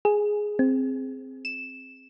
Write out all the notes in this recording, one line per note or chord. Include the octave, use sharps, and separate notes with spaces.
G#4
C4
E7